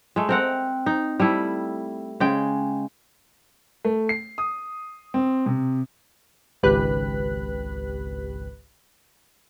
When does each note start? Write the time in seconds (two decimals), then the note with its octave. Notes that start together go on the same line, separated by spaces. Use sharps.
0.16 G#3 A3
0.29 C4 A#4 F#5
0.86 D#4
1.20 G3 A3 E4
2.20 C#3 G#3 G5
3.85 A3
4.09 C7
4.38 D#6
5.14 C4
5.46 C3
6.63 G#1 C#2 G4 B4 F#6 B6